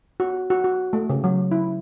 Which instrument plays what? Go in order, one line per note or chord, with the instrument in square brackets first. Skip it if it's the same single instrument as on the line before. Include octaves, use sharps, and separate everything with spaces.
[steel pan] F#4
F#4
F#4
A3
C#3
F#3
E4